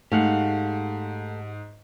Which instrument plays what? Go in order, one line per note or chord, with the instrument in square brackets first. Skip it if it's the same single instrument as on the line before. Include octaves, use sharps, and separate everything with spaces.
[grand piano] G#2 [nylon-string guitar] A3 G#5 [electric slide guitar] G4 F5 F#5